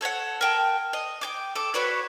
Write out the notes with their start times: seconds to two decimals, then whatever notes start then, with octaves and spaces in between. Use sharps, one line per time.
0.01 A4 C#5 D#5 F#5
0.41 A#4 G5 A5
0.93 D#5
1.21 G5 G#5 D6
1.55 A4 D6
1.74 F#4 B4 C#5 D5